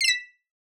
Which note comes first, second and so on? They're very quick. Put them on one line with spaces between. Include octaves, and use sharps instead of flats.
C7 E7 B6